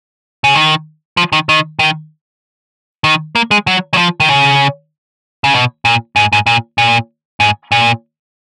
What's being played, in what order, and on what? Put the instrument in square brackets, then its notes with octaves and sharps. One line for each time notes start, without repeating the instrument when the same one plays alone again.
[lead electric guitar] C#3
D#3
F3
D#3
D#3
D#3
D#3
A#3
G#3
F#3
F#3
F3
D#3
C#3
C#3
B2
A#2
G#2
G#2
A#2
A#2
G#2
A#2